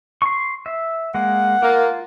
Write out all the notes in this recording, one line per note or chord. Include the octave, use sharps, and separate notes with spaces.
C6 C#6
E5
G#3 A#3 F#5
A#3 F4